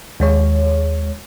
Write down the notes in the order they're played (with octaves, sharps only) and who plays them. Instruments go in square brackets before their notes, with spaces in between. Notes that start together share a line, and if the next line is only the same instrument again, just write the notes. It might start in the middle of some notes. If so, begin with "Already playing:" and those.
[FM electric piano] D#2 G#3 C#5